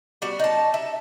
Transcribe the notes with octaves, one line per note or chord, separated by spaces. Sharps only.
G3 B3 F#4
D#4 A5
E5